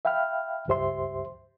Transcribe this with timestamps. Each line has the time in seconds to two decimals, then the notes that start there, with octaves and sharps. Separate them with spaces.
0.05 E5 F5 G5 B5 F6
0.68 C#2 G2 G4 C5 E5 C6